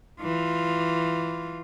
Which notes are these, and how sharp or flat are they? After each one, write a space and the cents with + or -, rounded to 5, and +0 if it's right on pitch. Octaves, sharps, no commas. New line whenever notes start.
E3 +0 F4 +0